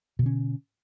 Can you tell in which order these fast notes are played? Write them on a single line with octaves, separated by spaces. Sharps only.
B2 D3 C#4